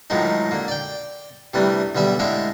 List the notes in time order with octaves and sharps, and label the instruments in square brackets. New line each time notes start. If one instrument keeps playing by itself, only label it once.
[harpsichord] A2 D#3 F3 F#3 G#3 D#4
D3 A#3
D5 G5
C3 E3 G3 A3 D4
B1 D3 G3 D5 E5
A2 D3 G#3 E5 F5 D6